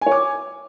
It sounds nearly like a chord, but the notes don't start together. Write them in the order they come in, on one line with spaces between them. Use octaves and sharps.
G#5 C#5 D6